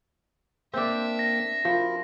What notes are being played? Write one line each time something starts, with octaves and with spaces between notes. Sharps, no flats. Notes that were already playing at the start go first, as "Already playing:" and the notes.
A#3 C4 D4 A#4 E5 G5
A#6
F3 F#4 A#4 B5